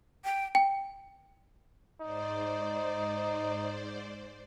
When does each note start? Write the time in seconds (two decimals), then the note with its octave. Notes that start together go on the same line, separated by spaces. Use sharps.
0.25 G5
0.55 G5
2.01 G#2 D#4 C5 D5